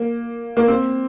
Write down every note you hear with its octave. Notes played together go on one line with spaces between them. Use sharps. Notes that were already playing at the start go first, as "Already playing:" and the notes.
Already playing: A#3
A#3
C4